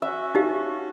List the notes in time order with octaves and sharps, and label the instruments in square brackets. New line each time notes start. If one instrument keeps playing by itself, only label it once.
[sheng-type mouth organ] C#4 F#4 [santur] E5
[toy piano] D#4 G4 F5